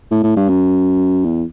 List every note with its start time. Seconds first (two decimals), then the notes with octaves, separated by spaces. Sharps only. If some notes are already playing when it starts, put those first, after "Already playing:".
0.11 A2
0.23 A2
0.36 G2
0.49 F#2
1.24 E2